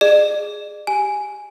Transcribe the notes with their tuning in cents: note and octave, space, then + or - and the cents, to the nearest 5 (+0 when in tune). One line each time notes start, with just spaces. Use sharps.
G#4 +0 D5 +45
G4 +0 G#5 +0